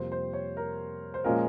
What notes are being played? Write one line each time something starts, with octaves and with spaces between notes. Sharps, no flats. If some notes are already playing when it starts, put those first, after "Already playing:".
Already playing: F2 C3 G3 A#3 C5
C5
C#5
A#4
C5
A#2 F3 G#3 C#4 F4 A#4